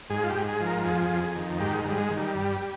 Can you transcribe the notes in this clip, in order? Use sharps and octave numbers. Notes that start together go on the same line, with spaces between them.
G#2 G#4
F4
G4
G#2
G#4
F3
A#4
F2 G#4
F2
D#3
G#2 G4
G#2 G3
G#3
D#3
G3
G2